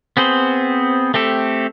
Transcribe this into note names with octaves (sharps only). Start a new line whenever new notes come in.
B3 C4 G#4 C5
A3 C4 G4 A4